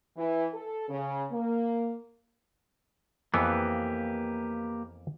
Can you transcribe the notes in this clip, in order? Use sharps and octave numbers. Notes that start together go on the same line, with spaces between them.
E3
A4
C#3
A#3
F2 E3 A#3 B3 G4 B4